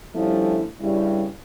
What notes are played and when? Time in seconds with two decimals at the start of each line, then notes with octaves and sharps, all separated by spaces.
0.15 D3 F3 G3 A3 C#4 E4
0.80 G2 C#3 G3 C#4 E4